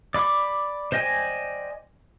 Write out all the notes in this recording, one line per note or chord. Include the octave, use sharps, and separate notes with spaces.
D5 B5 D6
C5 D5 D#5 G5 G#5